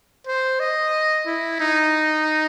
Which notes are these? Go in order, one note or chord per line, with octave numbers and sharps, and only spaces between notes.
C5
D#5
E4
D#4